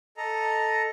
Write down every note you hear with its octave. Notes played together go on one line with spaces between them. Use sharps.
A4 D#5 A#5